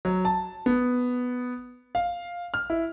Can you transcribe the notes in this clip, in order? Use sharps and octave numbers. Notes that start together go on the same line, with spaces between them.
F#3
A5
B3
F5
F6
E4